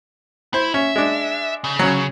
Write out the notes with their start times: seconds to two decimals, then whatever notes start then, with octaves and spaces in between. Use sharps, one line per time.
0.54 E4 C5
0.74 C#4 E5
0.96 G#3 D4
1.64 C#3
1.79 F#3 C#4